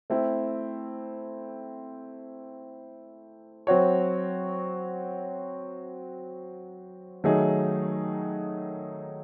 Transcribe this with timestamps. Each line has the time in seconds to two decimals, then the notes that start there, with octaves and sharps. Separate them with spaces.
0.10 A3 C4 E4
3.67 F#3 C4 F#4 C#5
7.24 D#3 F#3 A3 D#4 G#4